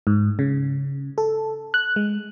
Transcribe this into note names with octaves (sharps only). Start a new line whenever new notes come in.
G#2
C#3
A4
F#6
G#3